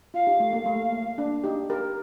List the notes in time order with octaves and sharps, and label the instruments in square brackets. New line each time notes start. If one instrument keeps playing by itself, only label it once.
[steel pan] F4 [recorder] F5
[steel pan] D#4 G4
A3
A#3
A3
A#3
D4
D#4 G4
G4 A#4